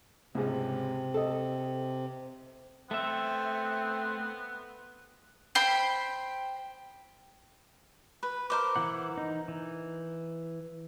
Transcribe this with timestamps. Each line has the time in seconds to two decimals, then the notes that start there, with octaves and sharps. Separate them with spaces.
0.35 C#2 G#2 C3
1.14 A4 D#5
2.91 A3 B3 C4 E5
5.55 C5 G5 B5
8.23 B4
8.50 A#4 C5 D6
8.76 E3 E4 F#5
9.17 D#4
9.48 E3